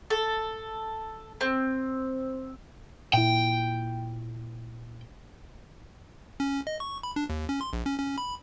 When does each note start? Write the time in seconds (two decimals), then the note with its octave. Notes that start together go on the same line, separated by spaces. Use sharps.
0.10 A4
1.41 C4
3.14 A#2 E4 G5
6.40 C#4
6.67 D#5
6.80 C#6
7.03 B5
7.16 D4
7.30 D#2
7.49 C#4
7.61 C6
7.73 A#1
7.86 C#4
7.99 C#4
8.18 B5